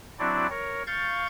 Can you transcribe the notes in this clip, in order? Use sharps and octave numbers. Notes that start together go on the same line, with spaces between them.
F#3 C4 D4 E4 F#4 D5
A#4 C#5
F5 C#6 G6 A6